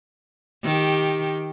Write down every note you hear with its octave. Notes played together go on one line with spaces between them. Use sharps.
D#3 G4